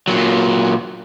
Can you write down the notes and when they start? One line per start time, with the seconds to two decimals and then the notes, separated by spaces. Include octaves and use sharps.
0.08 A#2 F#3